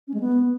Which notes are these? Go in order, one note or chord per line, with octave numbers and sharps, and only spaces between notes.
C#4
G#3
B3